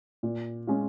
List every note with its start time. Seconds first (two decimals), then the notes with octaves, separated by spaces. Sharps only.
0.23 A#2
0.67 G#3 C#4 F4